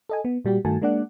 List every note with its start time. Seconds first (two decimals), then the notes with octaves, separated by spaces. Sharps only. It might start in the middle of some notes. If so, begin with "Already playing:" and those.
0.09 A4 D#5 G#5
0.25 B3
0.45 A#2 G3 F#4 G4
0.65 G2 D#3 A3 F#4 G#5 A5
0.82 G#3 A#3 D4 D5 F#5